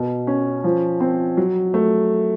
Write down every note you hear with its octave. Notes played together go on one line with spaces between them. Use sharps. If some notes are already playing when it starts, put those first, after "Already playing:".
Already playing: B2
C#4
F3
C4
F#3
A3